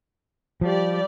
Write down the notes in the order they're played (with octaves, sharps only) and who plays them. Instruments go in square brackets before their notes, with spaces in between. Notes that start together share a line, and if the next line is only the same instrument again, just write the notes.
[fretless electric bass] F3 [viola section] G3 G4 D5